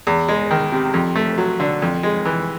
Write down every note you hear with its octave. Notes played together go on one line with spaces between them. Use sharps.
E2
G#3
D#3
C3
F2
A3
F#3
D3
F2
G#3
E3